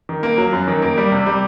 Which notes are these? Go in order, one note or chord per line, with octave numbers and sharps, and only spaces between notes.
D#3
A#3
F#3
F#2
D#3
A#3
G3
C3
G3